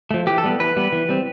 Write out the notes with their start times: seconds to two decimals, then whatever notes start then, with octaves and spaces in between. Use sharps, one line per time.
0.11 F3 A3
0.27 E3 G4
0.38 A4
0.44 G3 B3
0.60 E3 B4
0.76 G3 B3
0.93 E3
1.09 G3 C4